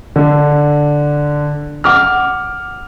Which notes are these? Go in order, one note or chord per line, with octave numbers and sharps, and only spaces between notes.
D3
F#5 D6 F6